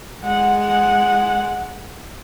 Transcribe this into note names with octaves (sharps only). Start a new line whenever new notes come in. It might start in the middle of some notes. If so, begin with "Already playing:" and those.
G#3 F#5